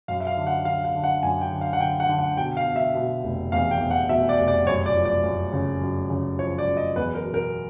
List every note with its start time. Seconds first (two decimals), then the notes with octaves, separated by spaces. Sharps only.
0.08 F#2 F5
0.20 E5
0.27 F5
0.37 D3
0.46 F#5
0.65 D3 F5
0.85 F5
0.95 D3
1.04 F#5
1.23 F#2 G#5
1.41 G5
1.52 D3
1.61 F5
1.73 F#5
1.80 D3 G5
2.00 F#5
2.09 D3
2.19 F#5
2.37 B2 G5
2.57 F5
2.66 B2
2.76 E5
2.94 B2
3.24 F1
3.52 E2 F5
3.71 G5
3.81 E2
3.91 F#5
4.09 B2 E5
4.29 D5
4.38 F1
4.48 D5
4.66 F#2 C#5
4.86 D5
4.95 F3
5.05 D5
5.24 F#2
5.53 C#3
5.81 F#2
6.10 C#3
6.39 F3 C#5
6.58 D5
6.67 F#2
6.77 D#5
6.96 E2 B4
7.15 A#4
7.25 B2
7.34 A#4